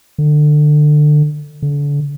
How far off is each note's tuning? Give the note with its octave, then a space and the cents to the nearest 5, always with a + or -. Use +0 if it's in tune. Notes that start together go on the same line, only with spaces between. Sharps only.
D3 +25
D3 -35